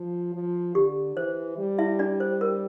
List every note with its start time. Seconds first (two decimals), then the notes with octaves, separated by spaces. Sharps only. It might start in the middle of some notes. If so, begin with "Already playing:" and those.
Already playing: F3
0.34 F3
0.75 D3 G4
1.16 E3 C5
1.57 G3
1.79 E4 E5
1.99 D4 D5
2.20 C5
2.41 A#4